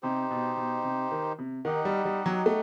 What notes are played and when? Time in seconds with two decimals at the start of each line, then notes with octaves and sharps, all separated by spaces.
0.03 C3 D#4 G4 C5
0.31 B2
0.57 B2
0.84 C3
1.11 D#3
1.39 C3
1.65 D#3 D#4 G4 D#5 F#5
1.85 G3
2.05 G3
2.26 F#3
2.46 A3